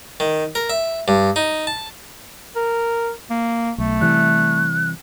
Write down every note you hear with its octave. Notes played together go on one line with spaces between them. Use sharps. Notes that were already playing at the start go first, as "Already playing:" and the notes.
D#3
A#4
E5
G2
D#4
A5
A#4
A#3
B1 A3
C3 E3 G3 F#6